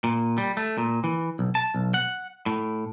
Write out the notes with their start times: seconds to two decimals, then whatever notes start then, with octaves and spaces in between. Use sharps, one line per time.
0.04 A#2
0.38 G3
0.57 A3
0.78 A#2
1.04 E3
1.39 B1
1.55 A5
1.74 B1
1.94 F#5
2.46 A2